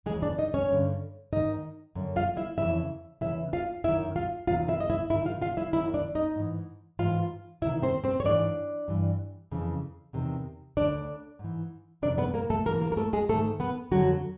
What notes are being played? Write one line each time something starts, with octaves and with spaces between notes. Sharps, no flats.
D#2 C#3 E3 G#3 G#4
D4 D5
D#4 D#5
C#4 C#5
G2 D3
G#2 D#3 D#4 D#5
F#2 D3
F4 F5
E4 E5
F2 C#3 E3 E4 E5
E2 C#3 E3 E4 E5
F4 F5
F#2 D#3 E4 E5
F4 F5
E2 C3 D#3 F4 F5
E4 E5
D#5
E4 E5
G#2 D#3 E4 E5
F4 F5
F4 F5
E4 E5
F#2 D#3 E4 E5
D4 D5
D#4 D#5
G#2 E3
G#2 E3 F4 F5
E2 C3 D#3 E4 E5
C4 C5
C4 C5
C#5
G#2 E3 D4 D5
G2 E3
F2 C#3 E3
E2 C3 D#3
D2 D3 D4 D5
G#2
E3
F2 C3 D#3 D4 D5
B3 B4
A#3 A#4
A3 A4
G#2 E3 A#3 A#4
A#3 A#4
A#4
A3 A4
G#3 G#4
G#2 D#3 A3 A4
B3 B4
F2 D3 F#3 F#4